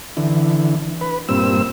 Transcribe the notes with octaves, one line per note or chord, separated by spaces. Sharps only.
D3 E3
B4
G2 A#2 C4 E6